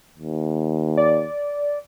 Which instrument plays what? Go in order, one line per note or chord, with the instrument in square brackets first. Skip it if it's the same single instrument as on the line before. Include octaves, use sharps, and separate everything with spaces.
[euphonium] D#2
[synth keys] D5